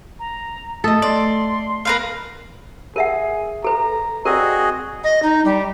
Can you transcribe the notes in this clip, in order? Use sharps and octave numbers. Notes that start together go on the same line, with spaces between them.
A#5
A3 A4 D#5 D#6
D5 C6
A#4 B4 F5
G#4 A#4 E5 F#5
A4 B4 A#5
C4 F#4 G#4 A#4 D5 D#5
D#5
D#4
G3